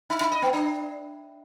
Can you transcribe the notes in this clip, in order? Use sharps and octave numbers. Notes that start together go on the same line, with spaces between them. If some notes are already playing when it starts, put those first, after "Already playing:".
D#4
D#4
D#5
B3
D4